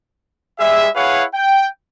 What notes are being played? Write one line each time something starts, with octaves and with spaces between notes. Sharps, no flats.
G3 G#3 G#4 E5
E4 G#4 B4 C#5 F5 F#5
G5